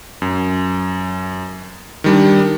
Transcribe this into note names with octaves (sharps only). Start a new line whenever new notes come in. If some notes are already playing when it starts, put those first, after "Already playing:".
F#2
D#3 G3 D4